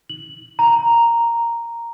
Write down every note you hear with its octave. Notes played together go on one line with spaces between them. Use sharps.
F#7
A#5